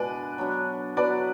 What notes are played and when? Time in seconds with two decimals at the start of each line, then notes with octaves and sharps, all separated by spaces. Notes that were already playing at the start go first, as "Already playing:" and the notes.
Already playing: B2 G#3 D4 B4 D5
0.38 F#3 B3 D4
0.97 F#3 B3 D4 B4 D5